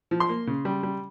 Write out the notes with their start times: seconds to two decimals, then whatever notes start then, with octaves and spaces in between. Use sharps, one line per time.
0.11 F3
0.20 C6
0.29 A#3
0.47 C#3
0.65 G3
0.83 G3